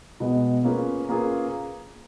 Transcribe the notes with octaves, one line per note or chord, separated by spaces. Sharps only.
B2 G#3 B3
A#3 C#4 F4 G#4 B4
A#3 C#4 F4 G#4 B4